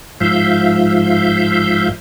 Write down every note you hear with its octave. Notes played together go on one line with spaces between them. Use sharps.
G#2 F3 E5 F5 G6